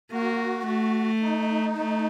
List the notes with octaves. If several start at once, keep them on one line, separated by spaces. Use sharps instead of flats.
A#3 F#4
A3
D#4
A3